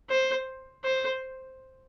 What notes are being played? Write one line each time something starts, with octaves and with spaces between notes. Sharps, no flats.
C5
C5